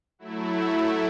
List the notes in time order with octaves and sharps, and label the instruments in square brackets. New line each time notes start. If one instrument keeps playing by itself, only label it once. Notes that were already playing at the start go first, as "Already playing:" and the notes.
[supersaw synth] F#3 A3 E4